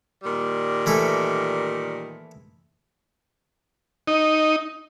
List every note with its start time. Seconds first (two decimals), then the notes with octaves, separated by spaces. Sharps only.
0.23 A#2 D#3 G3
0.86 E3 A3 A4
4.07 D#4